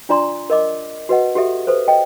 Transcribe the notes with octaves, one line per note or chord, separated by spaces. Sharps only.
D4 F4 D5 A#5 C6
A#4 D#5 D6
F#4 B4 D#5 F#5
F#4 G4 A4 E5
A4 B4 C5
D#5 G5